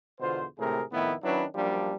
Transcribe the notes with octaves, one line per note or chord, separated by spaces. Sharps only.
E2 B2 D3 F4 C5
G#1 A2 C3 A3 G#4 A#4
F2 A2 D#3 A3 B3 E4
D#3 F#3 C#4 D4 E4 B4
F#2 F3 G3 A#3 D4